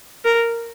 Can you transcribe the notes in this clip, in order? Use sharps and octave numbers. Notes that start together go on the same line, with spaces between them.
A#4